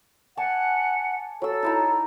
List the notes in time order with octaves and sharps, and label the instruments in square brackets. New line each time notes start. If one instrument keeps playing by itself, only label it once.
[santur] D5 G#5 A5 [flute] F#5
[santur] F#3 E6 [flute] A4
[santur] D#4 E4 A#5